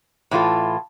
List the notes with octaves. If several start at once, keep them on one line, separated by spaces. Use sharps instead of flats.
A2 E3 F4 A4